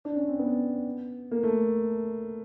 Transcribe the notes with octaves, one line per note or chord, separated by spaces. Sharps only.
D4
C#4
C4
B3
A#3
A3